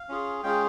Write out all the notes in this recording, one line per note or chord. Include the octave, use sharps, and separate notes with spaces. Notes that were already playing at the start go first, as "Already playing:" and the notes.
Already playing: F5
C#4 F4 G#4
G#3 C#4 F4 G#4 G5